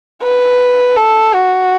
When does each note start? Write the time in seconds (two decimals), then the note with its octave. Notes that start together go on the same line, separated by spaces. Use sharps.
0.22 B4
0.96 A4
1.34 F#4